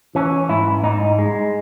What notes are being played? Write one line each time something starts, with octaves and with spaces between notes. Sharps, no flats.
E3 C#4
G#2 E4
G#2 D#4
G#3